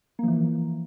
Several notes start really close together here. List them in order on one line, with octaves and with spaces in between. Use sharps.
A#3 F3 E3